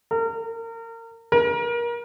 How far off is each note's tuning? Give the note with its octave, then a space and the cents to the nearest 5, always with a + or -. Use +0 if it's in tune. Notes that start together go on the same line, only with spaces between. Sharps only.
A#4 -30
A#4 +30